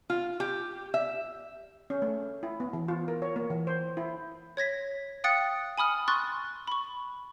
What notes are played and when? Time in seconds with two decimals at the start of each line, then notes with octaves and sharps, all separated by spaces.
0.10 F4
0.40 G4
0.94 E5
1.90 C#4
2.02 A3
2.43 E4
2.60 B3
2.73 E3
2.88 F4
3.08 A#4
3.22 C#5
3.36 A#3
3.50 E3
3.67 C5
3.97 E4
4.57 C#5 G#6 A#6 B6
5.24 F5 G5 D#6 F#6 A6 C#7
5.78 G#5 B5 D#6 F6
6.08 C6 C#6 F#6 A6
6.67 B5 C#6